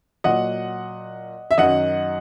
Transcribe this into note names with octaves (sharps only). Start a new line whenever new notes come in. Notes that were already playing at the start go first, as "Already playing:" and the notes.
A#2 F#3 D#5 F#5
E5
F#2 D#3 F#3 D#5 F#5